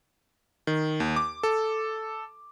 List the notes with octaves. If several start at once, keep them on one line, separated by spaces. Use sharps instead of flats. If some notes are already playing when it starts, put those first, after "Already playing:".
D#3
D#2
D6
A4